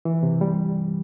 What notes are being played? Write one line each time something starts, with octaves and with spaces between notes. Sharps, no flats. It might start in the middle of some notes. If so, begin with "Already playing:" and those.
E3
C3
G3